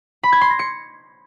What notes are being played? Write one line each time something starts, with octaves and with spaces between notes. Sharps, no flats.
B5
G#6
C6
A#6
C#7